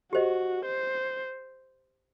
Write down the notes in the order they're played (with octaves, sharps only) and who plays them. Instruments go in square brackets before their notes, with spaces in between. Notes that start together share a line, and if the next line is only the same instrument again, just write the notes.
[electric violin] F#4 [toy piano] G4 C5 D#5
[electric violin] C5